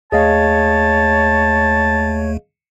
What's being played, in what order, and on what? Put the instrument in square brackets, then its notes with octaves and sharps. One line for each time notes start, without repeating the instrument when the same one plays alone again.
[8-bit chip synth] D#2 A3 [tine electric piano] G#4 D#5 F5 [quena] C#5 [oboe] A5